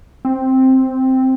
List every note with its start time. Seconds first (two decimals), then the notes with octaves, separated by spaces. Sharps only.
0.25 C4